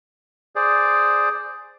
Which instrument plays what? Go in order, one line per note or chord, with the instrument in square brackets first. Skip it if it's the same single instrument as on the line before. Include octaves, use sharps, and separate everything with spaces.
[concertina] G#4 C5 D5